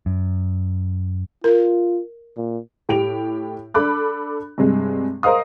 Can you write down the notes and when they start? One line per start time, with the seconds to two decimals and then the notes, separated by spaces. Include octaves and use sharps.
0.06 F#2
1.44 F4 A#4
2.37 A#2
2.89 A2 G4 D7 F7
3.74 D4 A4 B5 D6 F#6
4.58 G2 C3 G#3
5.23 A#4 C5 D#5 F5 D#6